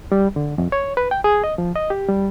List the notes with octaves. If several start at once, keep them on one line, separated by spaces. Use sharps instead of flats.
G3
D3
F2
C#5
B4
G5
G#4
D#5
F3
D#5
G4
G3